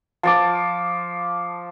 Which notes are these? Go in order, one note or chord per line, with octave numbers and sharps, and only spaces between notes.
F3 A5 D6